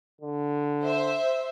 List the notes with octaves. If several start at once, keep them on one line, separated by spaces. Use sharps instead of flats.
D3
C5 E5